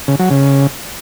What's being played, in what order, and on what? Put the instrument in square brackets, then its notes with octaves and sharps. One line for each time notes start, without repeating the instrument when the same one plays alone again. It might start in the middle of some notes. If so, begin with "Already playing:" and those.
[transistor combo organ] C#3
F#3
C#3